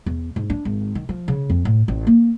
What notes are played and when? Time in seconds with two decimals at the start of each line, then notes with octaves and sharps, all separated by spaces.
0.06 E2
0.36 G#2
0.50 D4
0.65 G#1
0.95 D#3
1.09 F3
1.28 C#3
1.50 F2
1.65 A2
1.88 A1
2.07 A#3